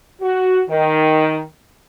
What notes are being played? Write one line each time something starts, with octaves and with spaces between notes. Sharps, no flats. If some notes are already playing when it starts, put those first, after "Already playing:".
F#4
D#3